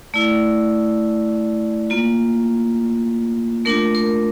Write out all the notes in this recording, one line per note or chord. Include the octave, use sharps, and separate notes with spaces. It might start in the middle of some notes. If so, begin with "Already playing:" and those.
A3 E4 D5
A#3 F4
A3 D4 F4 A#4
A#4